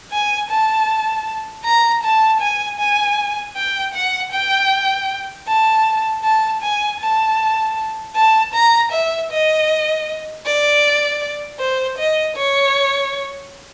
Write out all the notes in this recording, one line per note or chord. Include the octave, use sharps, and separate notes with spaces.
G#5
A5
A#5
A5
G#5
G#5
G5
F#5
G5
A5
A5
G#5
A5
A5
A#5
E5
D#5
D5
C5
D#5
C#5